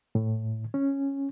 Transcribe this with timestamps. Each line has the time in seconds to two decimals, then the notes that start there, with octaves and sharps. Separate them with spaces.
0.15 A2
0.74 C#4